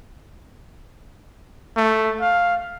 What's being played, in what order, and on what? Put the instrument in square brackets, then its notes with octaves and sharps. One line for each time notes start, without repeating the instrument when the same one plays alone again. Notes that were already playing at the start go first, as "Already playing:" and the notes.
[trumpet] A3
F5